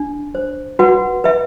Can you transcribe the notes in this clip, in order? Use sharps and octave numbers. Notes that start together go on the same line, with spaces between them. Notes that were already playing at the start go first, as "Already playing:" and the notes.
Already playing: D4
C5
F#4 B4 F#5
B4 E5